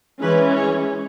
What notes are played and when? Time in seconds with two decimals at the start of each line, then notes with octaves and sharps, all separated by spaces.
0.20 E3 G#3 C#4 B4
0.56 C#5